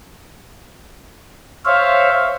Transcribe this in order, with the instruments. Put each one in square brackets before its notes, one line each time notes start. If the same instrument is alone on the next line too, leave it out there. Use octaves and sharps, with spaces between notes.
[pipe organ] C5 C#5 E5 F5